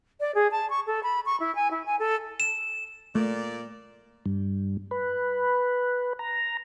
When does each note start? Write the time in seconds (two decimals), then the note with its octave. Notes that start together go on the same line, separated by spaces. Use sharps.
0.20 D5
0.35 G#4
0.51 A5
0.70 C#6
0.87 A4
1.03 B5
1.26 C#6
1.40 E4
1.55 G#5
1.71 E4
1.86 G#5
1.99 A4
2.40 E7
3.15 A#2 A3 D5
4.26 G2
4.91 B4
6.19 A#5